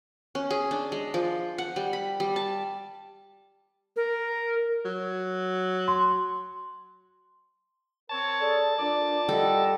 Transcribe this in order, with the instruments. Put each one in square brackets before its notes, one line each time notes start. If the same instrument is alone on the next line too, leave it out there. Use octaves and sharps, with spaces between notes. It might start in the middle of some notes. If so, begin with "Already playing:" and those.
[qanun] C#4
G#4
D4
G#3
F3
F#5
G3
B5
G3
A5
[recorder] A#4
[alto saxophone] F#3
[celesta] C6
[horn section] C4 A#4 C#5 [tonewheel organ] A5
[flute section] G#4 A4 D5
[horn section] F3 A#4 D5 [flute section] D4 D6
[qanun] G3 A4 [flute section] D#5 F#5